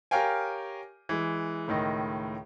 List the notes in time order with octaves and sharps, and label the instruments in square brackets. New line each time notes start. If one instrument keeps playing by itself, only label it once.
[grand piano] G4 A#4 C#5 F5 G5 G#5
E3 G#3
C#2 A2 D#3 D#5